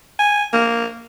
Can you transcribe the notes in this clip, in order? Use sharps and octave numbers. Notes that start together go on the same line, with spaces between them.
G#5
A#3